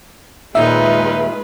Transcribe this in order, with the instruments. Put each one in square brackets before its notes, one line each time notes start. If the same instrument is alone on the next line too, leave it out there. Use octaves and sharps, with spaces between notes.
[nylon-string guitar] D#2 A#2 [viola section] G#3 F4 B4 [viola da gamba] D#4 [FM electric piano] E5